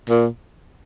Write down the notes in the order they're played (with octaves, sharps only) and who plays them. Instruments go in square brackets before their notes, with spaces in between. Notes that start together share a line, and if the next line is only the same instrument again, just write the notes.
[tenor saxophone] A#2